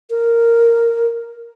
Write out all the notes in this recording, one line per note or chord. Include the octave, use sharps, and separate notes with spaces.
A#4